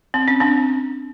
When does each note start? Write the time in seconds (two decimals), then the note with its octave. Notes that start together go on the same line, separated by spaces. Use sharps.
0.14 C4
0.28 C#4
0.40 C4 D4